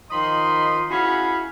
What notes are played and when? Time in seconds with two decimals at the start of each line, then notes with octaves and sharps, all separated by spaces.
0.11 D#3 F3 D#5 B5 C6
0.90 C#4 E4 F#4 G#4 F5 B5